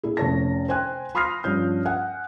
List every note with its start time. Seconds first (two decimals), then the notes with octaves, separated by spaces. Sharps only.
0.03 A#2 E4 G#4
0.17 F1 C#4 C#5 A5 A#6
0.69 C5 G5 G#5 C6 F#6
1.15 B5 C6 D#6 F6 A#6 C7
1.44 G2 F3 C#4 G6
1.85 F#5 G#5